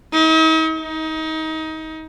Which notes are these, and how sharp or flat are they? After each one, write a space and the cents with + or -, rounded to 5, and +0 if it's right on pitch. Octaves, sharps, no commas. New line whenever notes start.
D#4 +45
D#4 +25